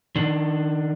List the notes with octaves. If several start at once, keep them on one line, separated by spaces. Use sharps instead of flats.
D#3 D4